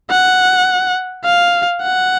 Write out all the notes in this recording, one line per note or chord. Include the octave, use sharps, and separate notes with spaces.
F#5
F5
F#5